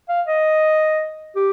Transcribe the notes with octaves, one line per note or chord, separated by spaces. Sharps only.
F5
D#5
G4